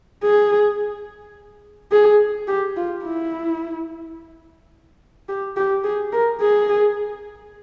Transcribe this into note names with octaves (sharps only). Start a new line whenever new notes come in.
G#4
G#4
G4
F4
E4
G4
G4
G#4
A#4
G#4